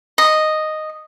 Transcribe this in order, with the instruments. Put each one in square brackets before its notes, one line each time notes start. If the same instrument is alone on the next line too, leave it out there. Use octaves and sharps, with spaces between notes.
[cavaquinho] D#5